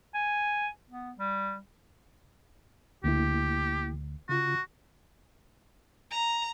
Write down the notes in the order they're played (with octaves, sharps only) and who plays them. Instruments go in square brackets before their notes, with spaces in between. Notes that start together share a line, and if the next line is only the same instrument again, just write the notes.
[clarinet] G#5
B3
G3
[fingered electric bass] D2 [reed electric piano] D3 A#3 E4 [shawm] G4
[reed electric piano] C#3 F4 [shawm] F#4
[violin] A#5